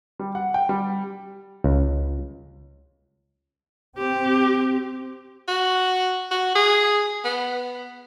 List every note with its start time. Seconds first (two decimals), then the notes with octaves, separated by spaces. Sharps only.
0.19 G3
0.35 F#5
0.54 G5
0.69 G3
1.64 C#2
3.97 C4 G4
5.48 F#4
6.31 F#4
6.56 G#4
7.25 B3